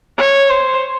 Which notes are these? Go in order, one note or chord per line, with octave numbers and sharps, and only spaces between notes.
C#5
C5